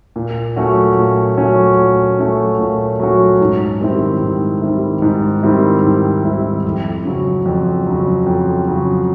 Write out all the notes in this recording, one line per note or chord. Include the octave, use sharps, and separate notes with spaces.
A#2
F#3 A3 C#4 F#4
A#2
F#3 A3 C#4 F#4
A#2
F#3 A3 C#4 F#4
A#2
F#3 A3 C#4 F#4
G#2
D#3 G3 C4 E4
G#2
D#3 G3 C4 E4
G#2
D#3 G3 C4 E4
G#2
D#3 G3 C4 E4
F2
C#3 F#3
F2
C#3 F#3
F2
C#3 F#3